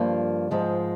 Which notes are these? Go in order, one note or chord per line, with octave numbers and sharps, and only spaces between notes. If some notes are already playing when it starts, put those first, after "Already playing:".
Already playing: G2 F3 A#3
G#2 F3 G#3